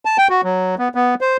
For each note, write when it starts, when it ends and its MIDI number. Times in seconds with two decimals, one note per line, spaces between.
0.05 0.17 81
0.18 0.28 79
0.29 0.41 66
0.44 0.75 54
0.79 0.88 59
0.95 1.15 59
1.21 1.37 72